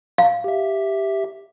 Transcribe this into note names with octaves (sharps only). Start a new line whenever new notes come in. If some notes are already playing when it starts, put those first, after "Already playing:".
F5
G4 E5